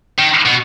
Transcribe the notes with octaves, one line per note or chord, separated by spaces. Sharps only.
D#3
B2